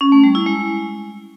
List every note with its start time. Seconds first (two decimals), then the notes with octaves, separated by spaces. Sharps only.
0.01 C#4
0.12 A3
0.24 G3
0.35 E4
0.46 G#3